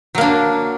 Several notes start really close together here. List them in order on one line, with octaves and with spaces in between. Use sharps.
F#3 A#3 D4